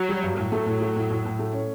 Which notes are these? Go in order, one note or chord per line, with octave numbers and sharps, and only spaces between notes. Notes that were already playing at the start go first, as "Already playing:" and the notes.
Already playing: F#3
G3
G2
A2 F#3
A3
A2
A3
A2
A2
A2
A3
C#4